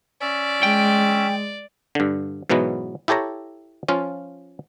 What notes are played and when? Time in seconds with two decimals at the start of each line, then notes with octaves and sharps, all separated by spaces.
0.21 C#4 D5 E5
0.63 G#3 G5
1.95 G2 D3
2.49 G#2 B2 E3 F#3 B3
3.08 E4 G4 A4 C#5 A#5
3.88 F3 C#4 F4